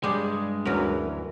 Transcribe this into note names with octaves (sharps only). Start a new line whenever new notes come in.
G2 G3 G#3 G#4
D2 E3 F#3 C#4 A#4 B4